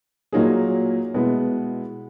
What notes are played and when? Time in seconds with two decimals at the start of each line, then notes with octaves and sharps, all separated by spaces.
0.33 A#2 F#3 A#3 D#4 G#4
1.14 B2 G#3 B3 E4